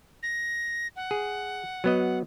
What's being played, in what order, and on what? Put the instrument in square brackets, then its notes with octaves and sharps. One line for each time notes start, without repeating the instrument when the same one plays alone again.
[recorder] A#6
F#5
[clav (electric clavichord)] G#4
F#3 B3 D#5